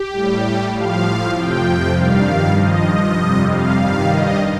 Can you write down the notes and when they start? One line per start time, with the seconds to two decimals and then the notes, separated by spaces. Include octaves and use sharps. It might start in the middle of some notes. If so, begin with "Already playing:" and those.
Already playing: G4
0.12 A2 G3
0.73 A2 F3 F5
1.34 F2 C3 F3 G5
1.95 G2 D#3 G3 F5
2.56 G2 F3 D#5
3.18 F2 C3 G3
3.48 F5
3.79 G2 D#3 G3 F5
4.10 D#5